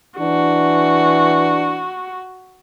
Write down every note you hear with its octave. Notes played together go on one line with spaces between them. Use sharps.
E3 D4 F#4